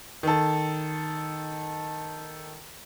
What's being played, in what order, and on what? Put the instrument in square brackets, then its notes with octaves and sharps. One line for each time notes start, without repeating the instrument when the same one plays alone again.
[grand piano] D#3 A4